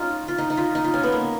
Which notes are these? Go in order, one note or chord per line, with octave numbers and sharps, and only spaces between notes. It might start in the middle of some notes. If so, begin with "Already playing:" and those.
Already playing: C#4 D#4 F4
F4
D#4
D#4
F4
D#4
F4
C#4
B3
A#3